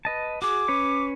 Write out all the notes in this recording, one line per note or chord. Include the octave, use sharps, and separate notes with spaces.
B4 D#5 A5
F#4 G#4 D6
C#4 B4 C#5